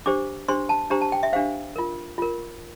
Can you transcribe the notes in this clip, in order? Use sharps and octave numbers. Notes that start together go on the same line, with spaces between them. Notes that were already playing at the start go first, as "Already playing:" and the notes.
D4 G4 C5 D6
D4 G4 C5 C6
A5
D4 G4 C5 A#5
A5
G5
E5
D4 G4 C5 F5
F4 A#4
F4 A#4